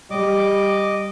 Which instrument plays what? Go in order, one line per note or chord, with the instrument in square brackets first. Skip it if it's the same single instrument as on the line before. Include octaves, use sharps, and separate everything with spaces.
[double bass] G3 [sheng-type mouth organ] D#5 D6